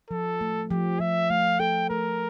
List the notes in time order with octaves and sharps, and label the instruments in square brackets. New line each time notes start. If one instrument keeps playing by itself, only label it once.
[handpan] F3 [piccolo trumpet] A4
[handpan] A3
[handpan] F3 [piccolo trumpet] G4
[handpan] F3 [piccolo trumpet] E5
[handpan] A3 [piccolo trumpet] F5
[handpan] A4 [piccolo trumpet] G5
[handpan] A3 [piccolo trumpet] A#4